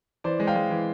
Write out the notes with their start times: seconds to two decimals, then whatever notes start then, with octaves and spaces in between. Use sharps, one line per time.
0.24 E3 C5 D5
0.40 G#3
0.47 F5 G5
0.55 G#3
0.70 E3